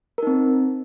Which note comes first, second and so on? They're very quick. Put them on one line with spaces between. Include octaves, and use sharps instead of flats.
A#4 D#4 C4